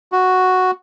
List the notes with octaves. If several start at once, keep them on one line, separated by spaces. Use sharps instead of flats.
F#4